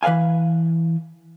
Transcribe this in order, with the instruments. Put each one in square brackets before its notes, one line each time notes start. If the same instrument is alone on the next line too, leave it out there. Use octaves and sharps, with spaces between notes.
[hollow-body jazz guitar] E3 B4 D#5 F5 G#5